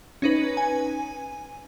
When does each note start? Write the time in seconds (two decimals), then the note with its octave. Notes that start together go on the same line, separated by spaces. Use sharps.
0.22 C#4 D#4 B4
0.57 G#5